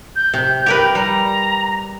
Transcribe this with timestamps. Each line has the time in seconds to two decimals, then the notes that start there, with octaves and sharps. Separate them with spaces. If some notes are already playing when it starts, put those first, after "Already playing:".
0.16 G6
0.34 C3
0.66 G4 A#4 B4
0.95 G3 A#5